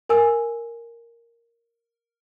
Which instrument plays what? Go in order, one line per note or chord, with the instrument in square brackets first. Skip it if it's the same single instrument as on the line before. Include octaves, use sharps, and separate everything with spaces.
[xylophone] A#4 G#5 E6